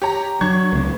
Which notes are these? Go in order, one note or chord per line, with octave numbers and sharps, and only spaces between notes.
G4 C#5 A#5
F#3 D4 C#6 G#6
C#2 C3 A3